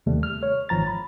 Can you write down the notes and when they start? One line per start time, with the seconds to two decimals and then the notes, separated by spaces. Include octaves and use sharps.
0.06 D#2 C3 D#3 G3 A3
0.23 F6
0.43 C#5
0.69 G#1 F3 A#5 A6
0.87 B5